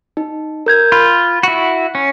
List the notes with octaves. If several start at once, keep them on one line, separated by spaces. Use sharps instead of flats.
D#4
A#4 G6 G#6
F4 B5
E4 F#4
C#4